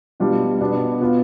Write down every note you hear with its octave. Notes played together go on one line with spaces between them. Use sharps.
B2 G3 D4 F4
B2 B3 D4
B2 B3 F4